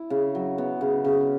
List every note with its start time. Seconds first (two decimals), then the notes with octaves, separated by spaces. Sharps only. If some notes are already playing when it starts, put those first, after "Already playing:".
Already playing: E4
0.10 C#3
0.35 F#3
0.58 B3
0.81 C#3
1.05 C#3